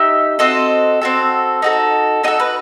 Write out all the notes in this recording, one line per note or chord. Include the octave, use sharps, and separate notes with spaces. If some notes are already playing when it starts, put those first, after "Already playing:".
Already playing: D#4 G4 E5
C4 F#4 A4 D#5
C4 F#4 A4
D#4 F#4 A4
D#4 F#4 A4 D#5
B4